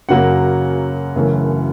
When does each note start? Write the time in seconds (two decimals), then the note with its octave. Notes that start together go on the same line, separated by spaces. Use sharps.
0.09 F#2 C#3 F#3 A#3 F#5
1.15 F#1 F#2 C#3 E3 A3